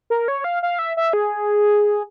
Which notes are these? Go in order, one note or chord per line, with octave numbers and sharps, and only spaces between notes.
A#4
C#5
F5
F5
E5
E5
G#4